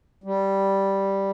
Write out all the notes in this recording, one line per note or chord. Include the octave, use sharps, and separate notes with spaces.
G3